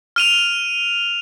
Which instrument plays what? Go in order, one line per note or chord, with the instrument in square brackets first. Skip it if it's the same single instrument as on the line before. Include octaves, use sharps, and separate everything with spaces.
[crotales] F6 D#7 F7